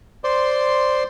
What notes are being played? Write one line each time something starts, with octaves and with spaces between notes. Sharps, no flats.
C5 D5 C6